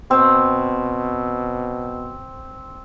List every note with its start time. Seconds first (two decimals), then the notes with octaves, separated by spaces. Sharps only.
0.11 B2 C4